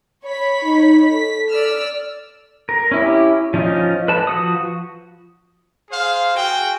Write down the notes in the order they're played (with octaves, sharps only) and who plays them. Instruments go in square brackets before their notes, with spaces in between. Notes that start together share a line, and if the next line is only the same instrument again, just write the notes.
[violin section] C#5 B5 B6
[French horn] D#4
[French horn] A4 [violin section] B6
[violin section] D5 E6 F6
[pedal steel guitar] A#4
C#4 E4 G4
F3 C#4 D#4 F4
B4 A5
F3 F#4 D#6
[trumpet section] G#4 C5 F5
F#4 G#4 G5